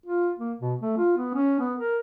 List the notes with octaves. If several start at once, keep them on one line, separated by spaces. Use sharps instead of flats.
F4
A#3
B2
A3
F4
B3
C#4
B3
A#4